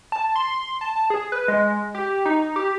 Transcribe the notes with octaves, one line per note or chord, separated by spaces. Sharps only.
A5
C6
C6
A5
G#4
B4
G#3
G4
D#4
G4